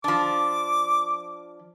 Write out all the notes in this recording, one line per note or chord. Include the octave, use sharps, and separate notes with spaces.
F3 D4 D6